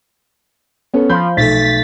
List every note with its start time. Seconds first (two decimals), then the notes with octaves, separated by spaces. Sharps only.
0.94 B3 C#4 A4
1.09 F3 B5 C6 G6
1.37 B1 A3 A6 B6